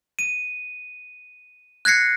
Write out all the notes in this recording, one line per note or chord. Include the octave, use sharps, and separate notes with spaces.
D#7
F#6 G#6 A#6 C7 C#7